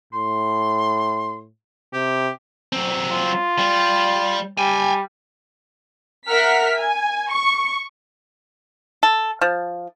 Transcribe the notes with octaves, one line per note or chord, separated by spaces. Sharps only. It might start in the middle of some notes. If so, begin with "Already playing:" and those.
A2 C6
C3 G4
F#3 C4
F4
G3
G3 G5 G#5
A#4 E5 F#5 F6 B6
G#5
C#6
A4
F3